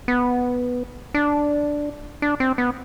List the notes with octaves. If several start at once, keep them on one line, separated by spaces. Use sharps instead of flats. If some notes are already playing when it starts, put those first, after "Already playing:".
B3
D4
D4
C4
B3